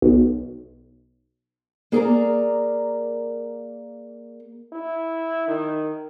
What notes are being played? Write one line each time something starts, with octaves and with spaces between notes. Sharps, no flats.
B1
A#3 G#4 A#4 D5 A#5
E4
D#3